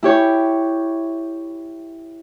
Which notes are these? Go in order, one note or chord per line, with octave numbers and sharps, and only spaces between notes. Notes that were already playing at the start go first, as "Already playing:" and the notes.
E4 G4 C#5